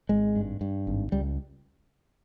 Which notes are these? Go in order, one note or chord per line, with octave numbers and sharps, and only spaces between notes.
G#1 G#3
G2
G2
G#1
C#2 G3